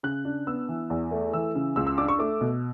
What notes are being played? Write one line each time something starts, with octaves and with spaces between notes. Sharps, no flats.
C#3 F#6
D4
B3 E6
E3
E2
A3
E3 E6
C#3
C#2 E6
E6
D4 D6
C#6
A3 D6
B2